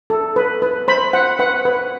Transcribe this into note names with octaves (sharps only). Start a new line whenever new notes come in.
A4
B4
B4
C5 B5
C5 F#5
B4 F#5
B4